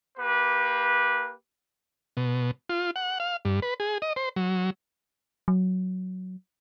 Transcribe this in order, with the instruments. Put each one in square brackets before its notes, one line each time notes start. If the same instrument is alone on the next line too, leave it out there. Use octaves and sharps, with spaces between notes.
[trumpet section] A#3 G4 B4
[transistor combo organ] B2
F4
F#5
F5
G2
B4
G#4
D#5
C5
F#3
[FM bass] F#3